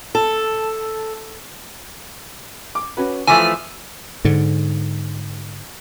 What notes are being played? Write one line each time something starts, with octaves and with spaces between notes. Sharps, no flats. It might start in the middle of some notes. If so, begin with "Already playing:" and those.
A4
D6
C#4 F#4 B4
E3 F3 A3 G#5 C#6 D6
G#2 D3